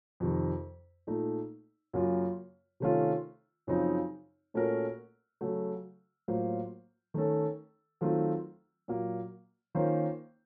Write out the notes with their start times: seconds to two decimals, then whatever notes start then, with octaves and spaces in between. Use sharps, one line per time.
0.20 F2 C3 D#3
1.07 A#2 A3 D#4
1.93 F#2 C#3 F#3 A#3 F4
2.80 C3 D#3 A3 C#4 F4
3.67 F#2 C#3 F3 C4 D#4
4.54 A#2 A3 C#4 F#4 A#4
5.41 C#3 F#3 A3
6.28 A2 F#3 A#3 F4 C5
7.14 D#3 A3 C#4 A4
8.01 D#3 F#3 A3 C4 F4
8.88 A#2 F#3 A#3
9.75 D#3 A#3 C#4 F4 C5